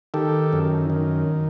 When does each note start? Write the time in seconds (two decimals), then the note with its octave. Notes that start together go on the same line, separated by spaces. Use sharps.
0.14 D#3 G4 A4
0.53 F#2
0.90 D#3